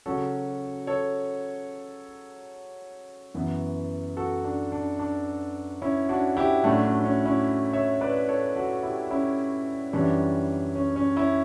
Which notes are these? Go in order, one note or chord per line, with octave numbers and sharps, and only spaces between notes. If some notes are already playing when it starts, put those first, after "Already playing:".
C#3 F#3 C#4 F#4 A4
A4 C#5
F#2 E3 B3
F#4 A4
D4
D4
D4
C#4 E4
D4 F#4
E4 G4
A2 F#3 A3 C#4 D4 F#4
D4
C#4
C#4 E4
C#5 E5
B4 D5
A4 C#5
F#4 A4
E4 G4
C#4 E4
F#2 E3 G3 C#4 D4
C#4
C#4
C#4 E4